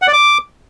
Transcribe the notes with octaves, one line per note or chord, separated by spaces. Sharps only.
F#5
D5
D6